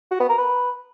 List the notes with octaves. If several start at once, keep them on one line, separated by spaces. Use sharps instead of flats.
F#4
B3
A#4
B4